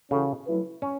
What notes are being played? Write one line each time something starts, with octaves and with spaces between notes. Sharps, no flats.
C#3 E3 C#4 F#4 A4
F#3 A3 E4 B4
C#4